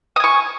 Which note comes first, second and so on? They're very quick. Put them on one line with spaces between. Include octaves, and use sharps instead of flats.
D#6 G#5 C#6